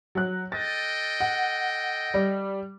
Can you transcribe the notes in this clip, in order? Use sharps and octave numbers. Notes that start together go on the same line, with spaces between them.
F#3 F#6
A4 D#5 G5 A6
F#5
G3